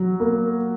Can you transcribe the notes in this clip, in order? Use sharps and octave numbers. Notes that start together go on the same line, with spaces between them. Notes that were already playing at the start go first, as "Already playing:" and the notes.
Already playing: F#3
A#3